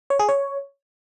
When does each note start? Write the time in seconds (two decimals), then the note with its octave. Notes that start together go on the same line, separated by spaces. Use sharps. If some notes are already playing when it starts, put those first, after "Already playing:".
0.10 C#5
0.19 G#4
0.29 C#5